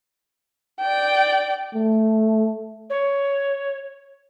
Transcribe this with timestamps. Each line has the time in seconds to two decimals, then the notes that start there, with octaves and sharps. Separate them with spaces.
0.81 D5 G5
1.75 A3
2.90 C#5